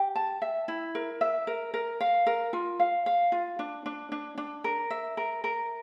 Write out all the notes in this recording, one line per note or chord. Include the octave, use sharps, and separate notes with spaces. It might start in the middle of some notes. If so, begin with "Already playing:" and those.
Already playing: G4
A5
E5
E4
A#4
E5
A#4
A#4
F5
A#4
F4
F5
F5
F4
D4
D4
D4
D4
A#4
E5
A#4
A#4